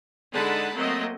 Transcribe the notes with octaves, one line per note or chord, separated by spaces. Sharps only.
D3 G#3 D#4 F#5 A5 B5
F#3 A3 A#3 C4 D#5